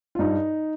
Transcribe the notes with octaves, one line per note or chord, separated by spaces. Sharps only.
F4
G2 D#4